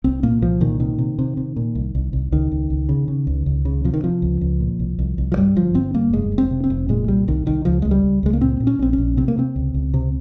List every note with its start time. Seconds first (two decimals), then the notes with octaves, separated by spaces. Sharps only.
0.04 C2 C4
0.23 A#2 A#3
0.41 C2 F3
0.60 A#2 D#3
0.80 C3 D#3
0.98 C3
1.19 C3
1.37 C3
1.56 A#2
1.75 C2
1.95 C2
2.13 C2
2.32 C#2 D#3
2.52 C#2
2.70 C#2
2.89 C#3
3.08 C#3
3.27 C#2
3.46 C#2
3.65 C#3
3.84 C3 F3
3.94 D#3
4.04 C3 F3
4.22 C#2
4.41 C#2
4.60 A#2
4.79 C2
4.99 C2
5.18 C2
5.32 F3
5.37 G2 G3
5.55 G1 F3
5.74 G1 C4
5.94 G2 A#3
6.13 F1 G#3
6.32 F1
6.38 C4
6.51 C3
6.64 C4
6.70 F1
6.89 A#2 G#3
7.08 C2 G3
7.28 C2 D#3
7.46 C2 D#3
7.65 C#2 F3
7.82 C#2 G#3
7.91 G3
8.03 C#2
8.23 C#2 G#3
8.33 A#3
8.41 A#2 C4
8.60 A#2
8.67 C#4
8.79 A#1 C4
8.93 C#4
8.98 A#1
9.17 C3 C4
9.28 A#3
9.37 C3 C4
9.56 C#2
9.74 C#2
9.94 C3